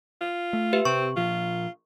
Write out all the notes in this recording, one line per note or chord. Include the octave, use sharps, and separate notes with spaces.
F4
A3
G4 B4 E5
C3 C4 C#6
A#2 F3 F4